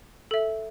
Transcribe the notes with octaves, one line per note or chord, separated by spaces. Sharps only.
A4 E5